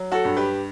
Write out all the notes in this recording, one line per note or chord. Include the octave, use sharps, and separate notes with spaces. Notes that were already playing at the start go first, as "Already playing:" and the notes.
Already playing: F#3
F#4 A4
G2
G4 B4